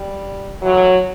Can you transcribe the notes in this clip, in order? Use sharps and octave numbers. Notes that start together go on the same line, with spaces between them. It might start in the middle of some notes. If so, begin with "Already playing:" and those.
Already playing: G3
A2 E3 F#3